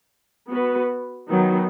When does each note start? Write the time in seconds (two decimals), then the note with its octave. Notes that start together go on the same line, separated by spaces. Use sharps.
0.50 B3 F#4 B4
1.28 D#3 F#3 B3 D#4